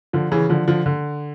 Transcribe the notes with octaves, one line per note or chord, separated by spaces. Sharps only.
D3 F3
C#3 E3
D3 F3
D3 F3
D3